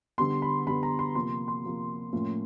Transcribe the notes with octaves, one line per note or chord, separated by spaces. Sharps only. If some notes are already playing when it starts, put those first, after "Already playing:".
D3 G3 B3 C6
B5
D3 G3 B3 B5
A#5
C6
C3 F3 A#3 C6
C6
C3 F3 A#3
A2 F3 A#3 C#4